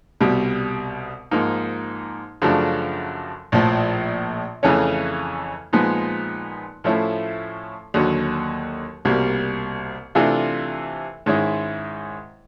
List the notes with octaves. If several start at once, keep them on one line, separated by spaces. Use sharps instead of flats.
C2 B2 G3
G#2 F3 A#3 D#4
F#2 C#3 F3 A3 D4
A#1 A2 F3
F2 C#3 E3 A3 C#4
A#2 F3 G#3 B3 D#4
A2 F3 A3 C#4 E4
D#2 D3 F#3
C2 B2 G3 A#3
C3 E3 A3 D4 F4
G#2 D#3 G#3 C#4 E4